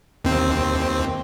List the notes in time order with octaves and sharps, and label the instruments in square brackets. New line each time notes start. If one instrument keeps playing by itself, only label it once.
[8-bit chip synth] D#2 C4